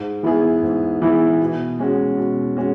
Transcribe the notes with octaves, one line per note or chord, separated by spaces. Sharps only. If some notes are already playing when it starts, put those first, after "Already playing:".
Already playing: G#2
E3 B3 E4 G#4
G#2
E3 B3 E4 G#4
B2
G#3 C#4 F#4
B2
G#3 C#4 F#4